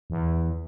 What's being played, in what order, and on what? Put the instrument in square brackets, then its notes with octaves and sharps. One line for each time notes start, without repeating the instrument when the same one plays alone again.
[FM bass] E2